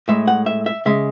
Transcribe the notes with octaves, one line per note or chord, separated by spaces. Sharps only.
A2 G#3 E5
F#5
E5
E5
C#3 G#3 E5